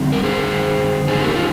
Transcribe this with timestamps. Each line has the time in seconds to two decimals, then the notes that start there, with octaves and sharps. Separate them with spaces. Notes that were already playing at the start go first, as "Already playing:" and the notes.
Already playing: D3 G3 C4
0.12 A#4
0.24 G#4 C5
1.08 D#3 G#3 D#4 G#4 C5
1.22 G4 A#4
1.36 F4